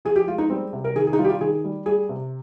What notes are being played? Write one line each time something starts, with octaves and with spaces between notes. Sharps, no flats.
F3 G#4
G4
G#3 F4
D#4
G3 C4
C3
A#4
D#3 G#4
G#4
D#4
G3 F4
G4
F4
D#3 G#4
G3
G3 G#4
C3